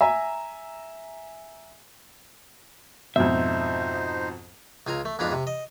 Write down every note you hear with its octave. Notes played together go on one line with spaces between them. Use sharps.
E5 G#5 A#5
F2 G#2 B2 D#4 C5 E5
C#2 F4 G#5 A#5
A3
F2 G#2 B3 D4 F4 A#5
C3
D#5